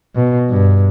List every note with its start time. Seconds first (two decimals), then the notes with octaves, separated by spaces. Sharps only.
0.16 B2
0.50 G2